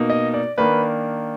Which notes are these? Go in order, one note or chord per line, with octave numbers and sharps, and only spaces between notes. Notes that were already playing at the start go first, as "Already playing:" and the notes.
Already playing: B2 A#3 D#4
D#5
D5
D#3 A#3 D4 B4